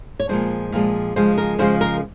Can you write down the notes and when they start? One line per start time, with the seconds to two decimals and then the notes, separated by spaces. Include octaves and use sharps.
0.20 C#5
0.29 A#2 F3 G#3 C5
0.72 A#2 F3 G#3
1.16 C#3 F3 G#3 C5
1.38 A#4
1.59 C#3 F3 G#3 C5
1.81 A#4